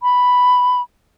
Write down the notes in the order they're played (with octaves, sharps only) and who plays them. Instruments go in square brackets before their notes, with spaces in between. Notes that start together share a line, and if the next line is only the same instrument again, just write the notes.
[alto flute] B5